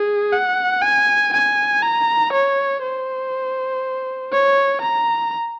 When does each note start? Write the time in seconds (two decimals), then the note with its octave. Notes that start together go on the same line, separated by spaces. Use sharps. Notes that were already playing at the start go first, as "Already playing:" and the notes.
Already playing: G#4
0.33 F#5
0.82 G#5
1.33 G#5
1.82 A#5
2.33 C#5
2.83 C5
4.32 C#5
4.82 A#5